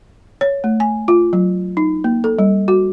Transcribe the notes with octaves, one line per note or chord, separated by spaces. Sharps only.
C#5
A3
G#5
F4
F#3
D#4
A#3
A4
G3
F#4